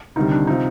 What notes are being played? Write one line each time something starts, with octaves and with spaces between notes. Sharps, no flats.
D2 C3 D#3 G3 D#4
D4
C3 F3 D#4